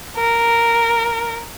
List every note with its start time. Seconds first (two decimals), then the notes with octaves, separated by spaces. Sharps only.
0.17 A#4